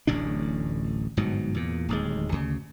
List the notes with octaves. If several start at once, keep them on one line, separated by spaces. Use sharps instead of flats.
D1 A1 A2 D4
G1 G#2 B2 F#3
E2 A#2
D1 D#2 G#3
D2 C#3